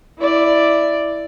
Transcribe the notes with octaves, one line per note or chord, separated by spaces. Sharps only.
E4 D5